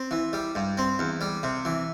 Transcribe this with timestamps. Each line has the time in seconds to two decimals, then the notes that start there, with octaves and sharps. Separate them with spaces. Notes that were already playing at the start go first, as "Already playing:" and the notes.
Already playing: C4
0.11 E3
0.33 G3
0.55 G2
0.78 C4
0.99 E2
1.21 G3
1.43 C3
1.65 E3